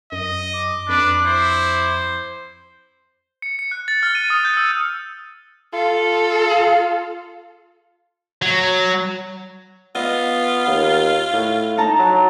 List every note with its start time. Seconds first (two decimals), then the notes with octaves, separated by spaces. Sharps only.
0.12 F#2 D#5
0.53 D6
0.89 F2 D4 B4
1.25 E4 C5
3.42 C#7
3.59 C#7
3.71 F#6
3.88 A6
4.03 F6
4.15 D#7
4.30 D#6
4.45 G6
4.57 E6
5.73 F4 A4
8.42 F#3
9.95 B3 F4 D#5
10.67 D#2
11.33 A2
11.77 D#4 A5 A#5
11.99 F#3